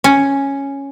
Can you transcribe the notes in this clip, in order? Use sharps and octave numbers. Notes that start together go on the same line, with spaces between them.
C#4